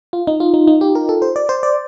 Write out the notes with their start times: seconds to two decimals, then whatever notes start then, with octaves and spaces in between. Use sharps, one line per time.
0.13 F4
0.27 D#4
0.40 F4
0.54 D#4
0.68 D#4
0.81 G4
0.95 A#4
1.09 A4
1.22 C5
1.36 D5
1.49 C5
1.63 D5